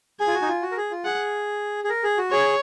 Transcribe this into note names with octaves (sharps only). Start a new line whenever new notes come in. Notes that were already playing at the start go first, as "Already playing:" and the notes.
G#4 G#5
F4
F#4
D#4
F4
F#4
A#4
G#4
F4
G#4 F#5
G#4
A#4
G#4
F#4
G#4 C#5